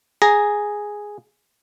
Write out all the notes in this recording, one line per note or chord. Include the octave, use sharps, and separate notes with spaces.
G#4 A#5